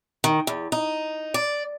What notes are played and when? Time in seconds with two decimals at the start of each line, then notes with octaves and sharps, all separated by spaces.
0.24 D#3
0.47 E2
0.72 D#4
1.34 D5